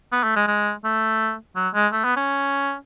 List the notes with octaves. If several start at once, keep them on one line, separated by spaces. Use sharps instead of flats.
B3
A3
G#3
G#3
A3
F#3
G#3
A3
B3
C#4